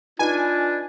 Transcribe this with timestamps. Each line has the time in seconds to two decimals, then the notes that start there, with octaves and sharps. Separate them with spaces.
0.19 D4 D#4 F4 B4 G#5